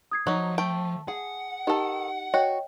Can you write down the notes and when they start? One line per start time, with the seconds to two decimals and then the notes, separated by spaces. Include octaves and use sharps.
0.11 D#6 G#6 C7
0.27 F3 F#3 D#4
0.58 A3 G5 A5
1.08 G#4 F#5
1.67 D#3 D#4 G4 A4 D#5
2.34 F#4 C#5 D#5 G5